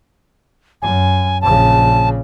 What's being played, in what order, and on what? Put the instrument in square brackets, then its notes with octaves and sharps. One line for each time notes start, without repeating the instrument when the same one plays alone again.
[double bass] F#2 [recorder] G#5
[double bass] A#1 C#3 [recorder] A5